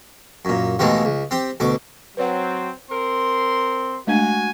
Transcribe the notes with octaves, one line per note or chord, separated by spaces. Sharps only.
F#2 A#2
D#2 B2 D#3 E3 G#3 A3
C#2
C4 G4
D2 B2 D6
F#3 C4 B4 C#5 F#5
C4 A#4 C6
G#3 A3 D4 F#4 G#5